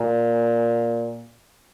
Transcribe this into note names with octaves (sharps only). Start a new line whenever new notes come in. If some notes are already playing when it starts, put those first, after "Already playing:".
Already playing: A#2